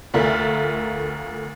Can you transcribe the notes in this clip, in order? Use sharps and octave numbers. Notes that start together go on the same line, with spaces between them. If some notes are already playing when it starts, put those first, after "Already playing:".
D2 A3 F4 A#4 E5 F#7